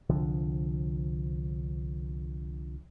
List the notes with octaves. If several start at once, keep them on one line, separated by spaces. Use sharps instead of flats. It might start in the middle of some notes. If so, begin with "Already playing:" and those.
C2 D3 F3